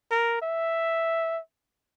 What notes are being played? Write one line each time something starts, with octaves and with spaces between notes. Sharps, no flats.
A#4
E5